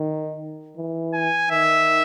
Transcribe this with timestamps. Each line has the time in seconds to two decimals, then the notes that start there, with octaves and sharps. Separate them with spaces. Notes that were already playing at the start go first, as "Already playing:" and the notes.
Already playing: D#3
0.77 E3
1.14 G#5
1.50 D#3 E5